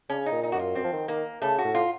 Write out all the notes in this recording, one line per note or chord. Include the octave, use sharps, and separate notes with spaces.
C#3 C#4
D#4
A#2
D#4
F#2 F#4
F4
F#2 C4
F3
D#3
D#3 A#3
C#3 A3
F#4
A2
F4